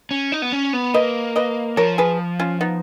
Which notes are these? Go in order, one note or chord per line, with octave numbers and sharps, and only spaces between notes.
C#4
D#4
B3
C#4
B3
A#3 B4 D#5
B4 D#5
F3 A#4 C#5
G#4 B4
C#4 F4
B3 D#4